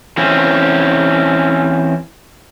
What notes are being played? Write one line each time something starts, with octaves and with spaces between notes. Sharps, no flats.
E3 C4 C#4